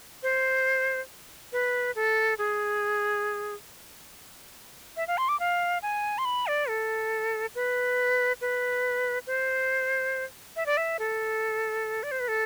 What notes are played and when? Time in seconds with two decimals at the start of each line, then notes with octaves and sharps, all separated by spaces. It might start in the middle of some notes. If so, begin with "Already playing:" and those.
0.23 C5
1.53 B4
1.95 A4
2.38 G#4
4.97 E5
5.08 F5
5.18 C6
5.29 D6
5.40 F5
5.82 G#5
6.18 C6
6.25 B5
6.47 D5
6.69 A4
7.55 B4
8.41 B4
9.27 C5
10.56 E5
10.66 D5
10.77 E5
10.99 A4
12.03 D5
12.11 C5
12.20 B4
12.28 A4